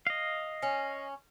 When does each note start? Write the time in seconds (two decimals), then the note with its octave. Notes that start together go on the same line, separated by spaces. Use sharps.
0.07 D#5 F5
0.62 C#4